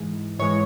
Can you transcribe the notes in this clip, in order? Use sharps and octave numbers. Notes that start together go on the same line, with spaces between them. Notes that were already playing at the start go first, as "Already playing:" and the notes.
Already playing: G#2 E3 G#3
G#2 E3 G#3 C#5